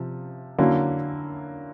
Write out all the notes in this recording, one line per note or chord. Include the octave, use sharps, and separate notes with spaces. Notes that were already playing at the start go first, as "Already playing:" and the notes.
Already playing: C3 F3
D3 F#3 A#3 C#4 E4